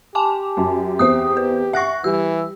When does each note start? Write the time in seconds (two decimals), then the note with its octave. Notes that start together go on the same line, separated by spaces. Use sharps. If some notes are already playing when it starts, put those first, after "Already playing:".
0.15 G4 G#5 A5 D6
0.57 F#2
0.99 E2 C4 E5 D#6
1.37 B4
1.73 E5 F#5 C#6 F#6 A#6
2.04 E3 G3 E6